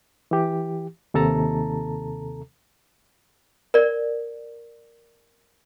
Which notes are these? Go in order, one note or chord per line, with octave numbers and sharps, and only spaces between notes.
E3 G4
D#2 C3 A4 A5 A#5
A#4 D5